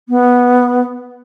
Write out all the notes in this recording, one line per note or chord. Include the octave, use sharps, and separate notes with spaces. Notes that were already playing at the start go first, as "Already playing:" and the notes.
B3